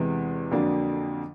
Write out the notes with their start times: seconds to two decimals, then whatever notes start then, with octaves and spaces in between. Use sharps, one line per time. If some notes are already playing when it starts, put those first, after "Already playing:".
Already playing: E2 C3 E3 G#3
0.51 F2 D3 F#3 A#3 D4